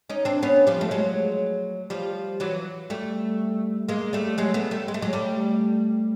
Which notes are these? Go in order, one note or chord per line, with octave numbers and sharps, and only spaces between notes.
C#4 D#4
C4 D4
B3 C#4
F3 G3
A3
F#3 G#3
F3 G3
E3 F#3
G3 A3
G#3 A#3
G3 A3
F#3 G#3
A3 B3
G3 A3
G#3
A3
F#3 G#3
G3 A3